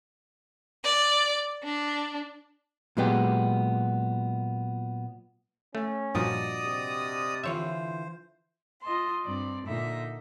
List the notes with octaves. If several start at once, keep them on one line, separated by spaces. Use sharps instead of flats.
D5
D4
A#2 F#3 G#3 B3 G4
A3 C#4
G2 A#2 F3 D4 F#4 D5 D#5 D#6
C3
D3 E3 F4 C5 C#5 E5
F4 D#5 A5 C6
G2 C4 D5
A#2 D3 D#4 E5